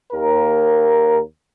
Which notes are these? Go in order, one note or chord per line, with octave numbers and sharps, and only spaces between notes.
D#2 A#4